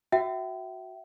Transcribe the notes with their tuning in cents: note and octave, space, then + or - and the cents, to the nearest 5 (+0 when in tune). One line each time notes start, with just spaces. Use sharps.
F#4 +0 E5 +0 G5 -35